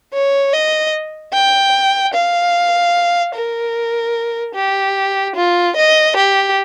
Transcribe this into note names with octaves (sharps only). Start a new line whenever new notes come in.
C#5
D#5
G5
F5
A#4
G4
F4
D#5
G4